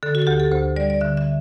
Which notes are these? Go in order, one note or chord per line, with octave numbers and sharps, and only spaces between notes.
D3 A4
F#4
A4
D2 G4
A4
D2 C5
G3 D5
D5
D3 E5
E5